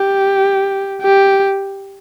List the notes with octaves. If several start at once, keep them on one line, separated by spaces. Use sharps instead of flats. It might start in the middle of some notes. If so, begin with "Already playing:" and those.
Already playing: G4
G4